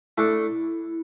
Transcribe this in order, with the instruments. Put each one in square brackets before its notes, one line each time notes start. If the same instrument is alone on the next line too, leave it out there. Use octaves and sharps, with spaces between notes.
[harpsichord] A3 D4 A4 [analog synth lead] E4